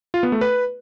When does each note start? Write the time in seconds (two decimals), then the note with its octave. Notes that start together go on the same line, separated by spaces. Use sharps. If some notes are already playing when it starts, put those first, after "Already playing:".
0.14 F4
0.23 B3
0.32 A3
0.41 B4